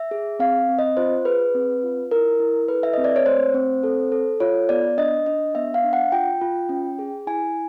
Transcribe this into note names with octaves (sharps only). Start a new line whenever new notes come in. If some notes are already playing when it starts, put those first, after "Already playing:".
Already playing: E5
G#4
C4 F5
C4
D#5
F4 C5
G#4 B4
C4
F4
E4 A#4
E4
A4 B4
E5
C4 D#5
D5
C#5
A3 C5
C4
A4
A4
F4 C#5
B3 D5
D4 D#5
D4 D#5
B3 E5
F5
D4
F#5
F4 G5
F4
C#4
G#4
E4 G#5